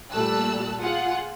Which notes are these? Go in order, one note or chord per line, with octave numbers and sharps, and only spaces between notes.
A#2 G3 A3 A5 E6 F#6
F4 G#4 F#5